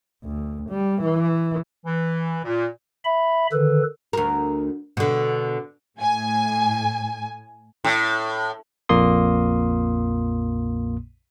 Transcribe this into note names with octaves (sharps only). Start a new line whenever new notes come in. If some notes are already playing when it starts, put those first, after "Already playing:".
D2
G3
E3
E3
A#2
E5 B5
D3 D#3 A4 B4
D2 A#4
B2 D3
A2 G#5
A2
A#1 F2 A#2 A#3 C6 D#6